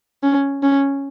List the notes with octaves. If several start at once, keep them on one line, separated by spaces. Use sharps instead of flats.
C#4
C#4